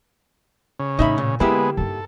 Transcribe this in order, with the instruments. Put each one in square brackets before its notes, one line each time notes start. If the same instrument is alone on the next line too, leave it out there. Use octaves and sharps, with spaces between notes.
[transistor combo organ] C#3
[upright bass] A2 E3 [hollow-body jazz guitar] D#4 E5 B5
[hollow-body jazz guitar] A#2
[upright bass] D3 [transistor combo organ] G#3 B3 [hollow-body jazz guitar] A#3 E4 G4
[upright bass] G2 D#4 [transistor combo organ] A4